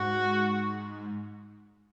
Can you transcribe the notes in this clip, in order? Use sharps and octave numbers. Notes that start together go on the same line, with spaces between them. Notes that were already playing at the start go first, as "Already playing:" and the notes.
Already playing: G#2 F#4